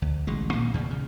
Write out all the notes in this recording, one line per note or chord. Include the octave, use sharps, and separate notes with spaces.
D2
A1 B2 G#3
A#2 D#3 A#3
E2 C#3
C#3